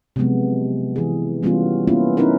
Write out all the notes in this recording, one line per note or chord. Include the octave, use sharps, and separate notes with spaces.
C3 F3 F#3 G#3 B3
E3 G#4
E3 G3 B3 C#4 F4 F#4
A#3 B3 C#4 E4 F4
C4 C#4 D#4 E4 A#4 B4